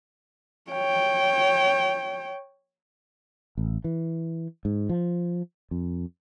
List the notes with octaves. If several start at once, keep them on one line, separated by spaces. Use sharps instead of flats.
C#5 G5
A1
E3
G#2
F3
F2